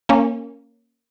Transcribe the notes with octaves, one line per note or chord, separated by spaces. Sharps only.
A#3 C#4